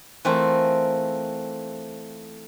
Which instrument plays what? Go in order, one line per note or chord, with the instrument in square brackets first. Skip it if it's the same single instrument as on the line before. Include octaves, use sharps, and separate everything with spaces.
[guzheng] E3 A3 C4 F4 A4 A#4